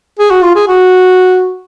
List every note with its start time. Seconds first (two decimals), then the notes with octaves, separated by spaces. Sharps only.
0.19 G#4
0.30 F#4
0.42 F4
0.55 G#4
0.68 F#4